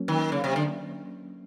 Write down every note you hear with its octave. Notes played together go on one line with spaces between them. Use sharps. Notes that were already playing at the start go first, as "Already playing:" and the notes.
Already playing: F#3 A#3 C#4
D#3
C#3
C3
D3